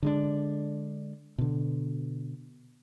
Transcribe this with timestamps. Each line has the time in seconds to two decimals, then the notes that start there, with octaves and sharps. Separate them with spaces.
0.03 D3 G#3 D4
1.38 B2 D3